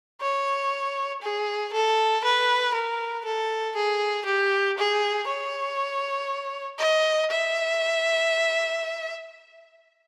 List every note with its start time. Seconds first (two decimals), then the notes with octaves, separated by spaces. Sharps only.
0.21 C#5
1.22 G#4
1.73 A4
2.24 B4
2.74 A#4
3.26 A4
3.76 G#4
4.26 G4
4.78 G#4
5.27 C#5
6.79 D#5
7.31 E5